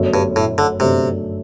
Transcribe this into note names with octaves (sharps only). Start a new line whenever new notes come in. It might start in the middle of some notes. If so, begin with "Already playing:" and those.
Already playing: G1 F#2 F#3 A3 D4
G2
A2
D3
G1 F#2 C3 F#3 A3 D4